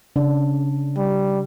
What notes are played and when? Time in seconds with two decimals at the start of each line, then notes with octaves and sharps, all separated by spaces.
0.16 C#3 D4
0.96 G3